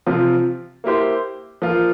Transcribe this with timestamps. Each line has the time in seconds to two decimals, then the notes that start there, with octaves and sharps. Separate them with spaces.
0.07 C3 F3 C4 F4
0.84 A#3 E4 G4 C5
1.62 F3 A#3 F4